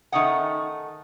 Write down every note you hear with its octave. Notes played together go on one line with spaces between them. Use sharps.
D#3 A3 C#4 D#4 F#5